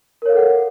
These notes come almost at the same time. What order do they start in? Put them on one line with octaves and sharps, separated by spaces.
A#4 C#5 F5 A4 F#5